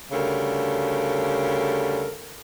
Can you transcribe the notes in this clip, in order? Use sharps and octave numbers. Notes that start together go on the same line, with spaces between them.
D2 C#3 G3 A4 A#4